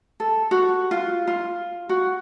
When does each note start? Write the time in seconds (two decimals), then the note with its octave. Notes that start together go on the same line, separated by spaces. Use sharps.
0.20 A4
0.51 F#4
0.91 F4
1.27 F4
1.89 F#4